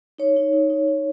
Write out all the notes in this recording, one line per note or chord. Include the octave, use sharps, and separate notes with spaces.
D#4 C#5
D#4
D#4
D#4
D#4